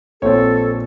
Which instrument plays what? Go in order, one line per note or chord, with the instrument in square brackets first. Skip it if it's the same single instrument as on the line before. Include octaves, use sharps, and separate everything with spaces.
[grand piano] A#1 A#2 [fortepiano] C4 C#5 [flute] A4